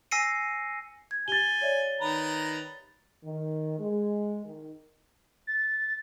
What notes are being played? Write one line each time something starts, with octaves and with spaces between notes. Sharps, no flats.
G#5 E6 A#6 C7 C#7 D#7
G#6
G4 G#5 A6 G7
C#5 D5 E5
D#3 B4 A#5
D#3
G#3
D#3
A6